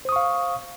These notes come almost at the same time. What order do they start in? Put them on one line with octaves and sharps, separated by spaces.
C5 D#6 C#6 F5